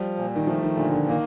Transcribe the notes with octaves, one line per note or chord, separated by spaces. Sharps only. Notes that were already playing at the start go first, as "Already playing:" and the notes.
Already playing: F3 G3
A#2
D#3
F3 A3
D#3
A#2 D3
D3
D#3 A#3